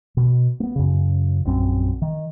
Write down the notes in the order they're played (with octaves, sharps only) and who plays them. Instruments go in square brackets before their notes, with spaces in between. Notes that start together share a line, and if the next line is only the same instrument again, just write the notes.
[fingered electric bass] B2
A#3 B3
F#2 C#3
A#1 F#2 C4
D#3